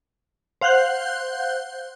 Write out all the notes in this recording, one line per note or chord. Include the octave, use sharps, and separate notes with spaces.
C5 F5 F#5 F#6 G6